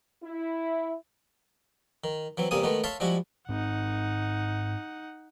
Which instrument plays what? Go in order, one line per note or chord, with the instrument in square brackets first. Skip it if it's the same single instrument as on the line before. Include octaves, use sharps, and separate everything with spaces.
[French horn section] E4
[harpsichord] D#3
E3 F#3 C4
E2 C3 G3 A#3 G#5 D#6
D#3 G#3 A3 B3
C#5 E5 F5 A5 C6
F3 G3 G#3 E4 F#4
[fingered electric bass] G#2 C4 [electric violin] D#4 F#5